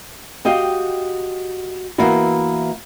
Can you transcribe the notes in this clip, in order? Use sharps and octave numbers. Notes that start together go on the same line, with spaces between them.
F#4 G4 D#5 F5 G5
E3 A#3 B3 E4 F#4